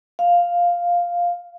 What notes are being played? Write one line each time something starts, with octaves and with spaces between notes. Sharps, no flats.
F5